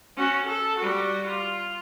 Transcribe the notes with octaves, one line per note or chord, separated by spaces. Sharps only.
C#4 F#4
A4
G3 F#4
F4